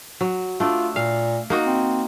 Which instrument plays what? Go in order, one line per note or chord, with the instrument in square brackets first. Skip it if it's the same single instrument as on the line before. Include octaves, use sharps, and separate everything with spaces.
[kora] F#3
[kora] A3 D4 [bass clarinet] F4
[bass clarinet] A#2 [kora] F5
[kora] A#3 D#4 F#4
[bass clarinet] C4